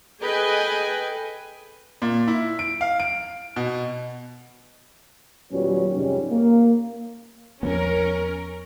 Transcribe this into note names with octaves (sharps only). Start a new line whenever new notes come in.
G#4 A4 B4 D#5 G5 G#5
A#2
E4
D7
F5
D7
B2
D#2 A#2 F#3 G3 B3 C#4
F2 G#2 C3 G3 C#4
A#3
E2 F3 B3 C#4 A#4